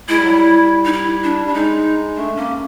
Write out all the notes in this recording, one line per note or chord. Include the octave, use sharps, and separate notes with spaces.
G#3 E4
G3
F#3
G3
D#4
E4
D4
G3 D4
G#3 D#4
A3 D4
A#3 C#4